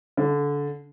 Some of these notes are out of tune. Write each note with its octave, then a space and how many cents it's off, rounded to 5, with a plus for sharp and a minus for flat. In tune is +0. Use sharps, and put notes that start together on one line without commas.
D3 -25